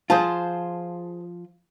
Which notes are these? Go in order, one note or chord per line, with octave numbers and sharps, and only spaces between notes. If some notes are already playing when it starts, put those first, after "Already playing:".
F3 F4 G#4 C5 A5